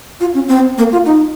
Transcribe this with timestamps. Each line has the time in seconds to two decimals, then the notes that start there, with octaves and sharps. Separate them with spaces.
0.20 F4
0.34 C#4
0.48 C4
0.78 A#3
0.92 F4
1.06 D#4